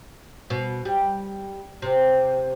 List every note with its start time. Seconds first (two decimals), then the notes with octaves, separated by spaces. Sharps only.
0.50 B2
0.85 G3
1.82 C3